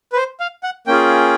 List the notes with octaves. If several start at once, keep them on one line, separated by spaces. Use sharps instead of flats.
B4
C5
F5
F#5
A#3 C#4 F4 G#4 G5